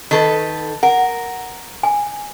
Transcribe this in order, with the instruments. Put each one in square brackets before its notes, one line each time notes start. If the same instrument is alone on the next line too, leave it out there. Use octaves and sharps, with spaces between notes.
[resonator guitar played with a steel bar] D#3 A4 B4
[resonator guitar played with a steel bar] A#4 [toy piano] F#5
[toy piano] G#5